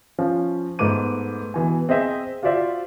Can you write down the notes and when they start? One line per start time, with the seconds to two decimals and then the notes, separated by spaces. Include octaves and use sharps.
0.19 F3 C#4
0.79 G#2 A3 B3 D6 D#7
1.54 B2 E3 G#5
1.89 C4 G#4 D#5 E5
2.43 F4 F#4 C5 D5 E5